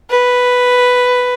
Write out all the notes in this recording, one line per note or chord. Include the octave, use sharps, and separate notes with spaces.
B4